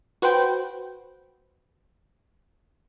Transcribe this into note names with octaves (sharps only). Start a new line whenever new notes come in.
F#4 B4 C5 G5